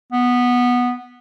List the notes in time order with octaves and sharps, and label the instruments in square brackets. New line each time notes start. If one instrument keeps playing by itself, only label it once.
[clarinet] B3